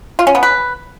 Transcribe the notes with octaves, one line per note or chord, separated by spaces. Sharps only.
F4
C#4
B3
B4